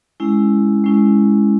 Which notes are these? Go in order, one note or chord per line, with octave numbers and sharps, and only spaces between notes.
G#3 C#4 E4
G#3 C#4 E4